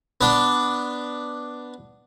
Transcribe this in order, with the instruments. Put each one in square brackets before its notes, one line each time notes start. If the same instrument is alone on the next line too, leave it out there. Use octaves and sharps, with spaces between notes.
[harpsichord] B3 D4